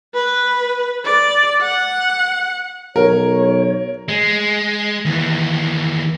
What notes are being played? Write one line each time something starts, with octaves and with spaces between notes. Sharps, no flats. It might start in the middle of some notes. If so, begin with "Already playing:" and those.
B4
D5
F#5
B1 A#4 C#5
G#3
D#2 E3